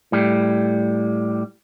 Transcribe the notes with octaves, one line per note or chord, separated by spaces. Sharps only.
A2 G3